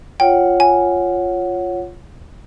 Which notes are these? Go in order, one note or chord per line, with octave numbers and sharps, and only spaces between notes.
F4 C#5 F#5 G5
G#5